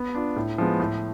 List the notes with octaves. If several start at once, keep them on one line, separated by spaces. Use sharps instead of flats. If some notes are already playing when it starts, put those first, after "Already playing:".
Already playing: B3
D4 F4
A2
F3 G#3 B3
A2